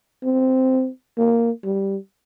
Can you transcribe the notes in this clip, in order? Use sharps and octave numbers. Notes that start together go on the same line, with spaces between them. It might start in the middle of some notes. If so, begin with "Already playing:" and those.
C4
A#3
G3